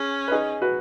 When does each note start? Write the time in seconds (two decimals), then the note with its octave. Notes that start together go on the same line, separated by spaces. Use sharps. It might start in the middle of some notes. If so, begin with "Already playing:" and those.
Already playing: C#4 G#4
0.28 B4
0.31 D#4 G#4
0.62 F#4 B4